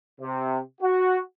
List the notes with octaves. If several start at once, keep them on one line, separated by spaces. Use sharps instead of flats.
C3
F#4